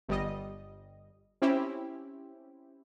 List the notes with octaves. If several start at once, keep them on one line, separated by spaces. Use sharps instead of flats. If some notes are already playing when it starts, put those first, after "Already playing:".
G1 G3 D#5
C4 C#4 E4 G4